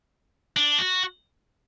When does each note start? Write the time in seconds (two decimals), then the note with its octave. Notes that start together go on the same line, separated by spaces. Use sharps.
0.56 D4
0.79 F#4